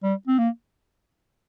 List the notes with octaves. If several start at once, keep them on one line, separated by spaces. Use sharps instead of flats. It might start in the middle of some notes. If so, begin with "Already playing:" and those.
G3
C4
A#3